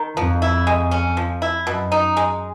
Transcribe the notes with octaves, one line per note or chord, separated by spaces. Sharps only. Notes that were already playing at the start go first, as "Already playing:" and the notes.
Already playing: D#3
F2 F3
E4
G#3
C#4
F3
E4
F#2 B2
D#4
G#3